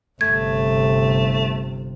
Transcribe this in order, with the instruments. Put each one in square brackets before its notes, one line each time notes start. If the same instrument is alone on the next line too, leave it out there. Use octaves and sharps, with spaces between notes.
[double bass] G1 C3 [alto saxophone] A3 [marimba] G#6